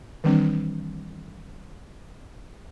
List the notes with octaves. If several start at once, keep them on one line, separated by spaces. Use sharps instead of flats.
D#3 E3 G3 C4 D4